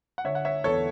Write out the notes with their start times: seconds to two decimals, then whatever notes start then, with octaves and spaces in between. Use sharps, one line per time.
0.18 F#5
0.24 D3 C#5 E5
0.35 F#5
0.45 C#5 E5
0.64 E2 A4 C#5